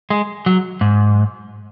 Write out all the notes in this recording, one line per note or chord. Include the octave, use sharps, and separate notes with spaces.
G#3
F#3
G#2